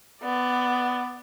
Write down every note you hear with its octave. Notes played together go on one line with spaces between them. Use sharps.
B3 D5